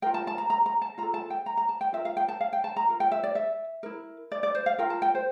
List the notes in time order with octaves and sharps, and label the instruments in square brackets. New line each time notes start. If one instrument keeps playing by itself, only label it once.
[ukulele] F4 A#4 G5
A5
A5
A#5
A#5
A#5
A5
F4 A#5
A4
A5
G5
A#5
A#5
A5
G5
F4 E5
A#4
F5
G5
A5
F5
G5
A5
A#5
F4 A#4
G5
E5
D5
E5
E4 A#4
D5
D5
C5
F5
F4 A#4 G5
A5
G5
C5